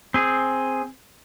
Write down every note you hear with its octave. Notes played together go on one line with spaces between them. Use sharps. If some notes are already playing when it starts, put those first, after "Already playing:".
C4 G#4